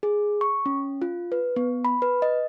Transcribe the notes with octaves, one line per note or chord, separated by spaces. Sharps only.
G#4
C#6
C#4
F4
B4
B3
B5
B4
D#5